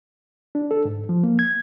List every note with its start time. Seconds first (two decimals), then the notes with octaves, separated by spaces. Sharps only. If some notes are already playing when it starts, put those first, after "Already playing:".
0.55 D4
0.71 A4
0.85 G#2
1.09 F3
1.23 A#3
1.39 G#6